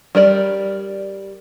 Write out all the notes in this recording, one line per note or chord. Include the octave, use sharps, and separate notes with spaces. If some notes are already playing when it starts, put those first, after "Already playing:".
G3 A#4 C#5 D5